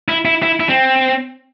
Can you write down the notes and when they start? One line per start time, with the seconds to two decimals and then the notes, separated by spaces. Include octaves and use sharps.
0.08 E4
0.25 E4
0.43 E4
0.60 E4
0.69 C4